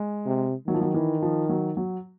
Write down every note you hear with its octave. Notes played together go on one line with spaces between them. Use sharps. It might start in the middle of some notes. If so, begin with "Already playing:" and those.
Already playing: G#3
C3
D#3 F#3
F3
F#3
E3
F3
F#3
F#3